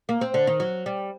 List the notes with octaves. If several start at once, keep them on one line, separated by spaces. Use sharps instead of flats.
A#3
C4
D3
D#3
F#3
G3